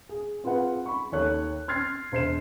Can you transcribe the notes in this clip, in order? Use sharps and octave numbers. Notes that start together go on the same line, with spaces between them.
G#4
C4 F4 G#4 B4 F#5
B5 C#6
D#2 A4 C#5 F#6
C6 F6 G#6 A6 C7
E1 C5 C7 E7